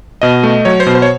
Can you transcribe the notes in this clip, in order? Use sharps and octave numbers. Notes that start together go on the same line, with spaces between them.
B2 D#5
A3
F#3 C#5
C5
B2
C5
C#5